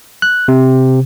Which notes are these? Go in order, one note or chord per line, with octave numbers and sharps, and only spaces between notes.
F#6
C3